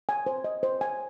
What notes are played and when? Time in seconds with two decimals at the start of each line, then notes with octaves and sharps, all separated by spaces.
0.09 G#5
0.26 C5
0.44 D#5
0.63 C5
0.81 G#5